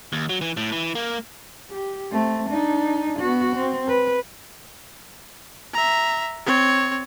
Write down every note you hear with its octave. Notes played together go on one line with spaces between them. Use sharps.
D#2
F#3
E3
A2
E3
A#3
G4
A3 C4
D4 D#4
B3 F#4
C4
B4
E5 A#5
C4 C#5